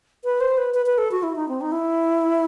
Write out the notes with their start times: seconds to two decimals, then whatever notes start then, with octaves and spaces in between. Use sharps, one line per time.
0.24 B4
0.41 C5
0.58 B4
0.74 B4
0.86 B4
0.98 A4
1.11 F#4
1.23 E4
1.36 D#4
1.49 C4
1.61 D#4
1.72 E4